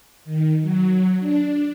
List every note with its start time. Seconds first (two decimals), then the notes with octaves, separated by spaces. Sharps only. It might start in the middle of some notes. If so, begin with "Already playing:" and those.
0.25 D#3
0.61 F#3
1.20 D4